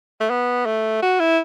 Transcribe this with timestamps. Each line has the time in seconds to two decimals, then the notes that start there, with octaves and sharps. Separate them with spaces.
0.20 A3
0.30 B3
0.66 A3
1.02 F#4
1.20 E4